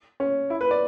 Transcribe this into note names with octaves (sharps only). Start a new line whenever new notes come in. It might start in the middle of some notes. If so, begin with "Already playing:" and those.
C#4
E4
B4
D5